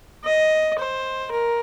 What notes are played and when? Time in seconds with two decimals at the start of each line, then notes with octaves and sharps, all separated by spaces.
0.25 D#5
0.79 C5
1.31 A#4